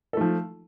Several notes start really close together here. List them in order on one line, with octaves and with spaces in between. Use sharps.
A4 A3 F3